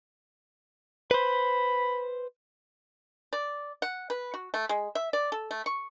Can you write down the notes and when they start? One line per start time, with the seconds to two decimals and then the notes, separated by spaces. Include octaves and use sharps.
1.11 B4 C5 B5
3.33 D5
3.82 F#5
4.10 B4
4.34 F#4
4.54 A3
4.69 G#3
4.95 E5
5.13 D5
5.32 A4
5.51 A3
5.66 C#6